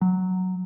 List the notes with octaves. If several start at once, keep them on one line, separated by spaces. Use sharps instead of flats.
F#3